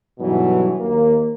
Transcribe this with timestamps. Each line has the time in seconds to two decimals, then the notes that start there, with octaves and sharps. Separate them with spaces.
0.19 B1 G2 B2 E3 F#3
0.80 D#2 A#3